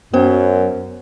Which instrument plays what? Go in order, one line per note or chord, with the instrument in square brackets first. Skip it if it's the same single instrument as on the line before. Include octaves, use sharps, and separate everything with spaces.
[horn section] F#2 [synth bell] B3 C5